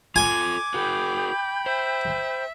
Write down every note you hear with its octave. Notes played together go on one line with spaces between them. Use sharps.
F4 A4 G#5 D6
F#4 G#4 A#4 G5 B5 G6
C5 E5